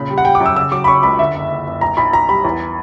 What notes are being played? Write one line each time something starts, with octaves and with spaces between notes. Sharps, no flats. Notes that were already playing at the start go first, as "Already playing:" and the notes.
Already playing: A#2 C#3 B5
G3
F#5
G3 G5
D6
F#2
E6
C#3 E6
F#3 D6
B5
C#3 C#6
C#2 B5
D3 E5
F#1
F#1
F#1
B1 A#5
B1 B5
B1 A#5
G3 B5
E2